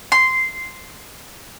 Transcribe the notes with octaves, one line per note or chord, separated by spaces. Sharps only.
C6